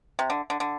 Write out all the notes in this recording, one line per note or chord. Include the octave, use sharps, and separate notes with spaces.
C3
D3
D3
D3